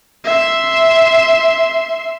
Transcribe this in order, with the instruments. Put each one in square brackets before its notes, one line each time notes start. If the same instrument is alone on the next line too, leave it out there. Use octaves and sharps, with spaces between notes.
[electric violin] E5 C6